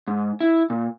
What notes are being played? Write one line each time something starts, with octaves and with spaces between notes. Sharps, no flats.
G#2
E4
A#2